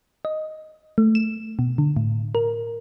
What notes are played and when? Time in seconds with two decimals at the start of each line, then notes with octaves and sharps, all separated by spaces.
0.25 D#5
0.98 A3
1.15 E7
1.59 B2
1.78 D3
1.97 A2
2.35 A#4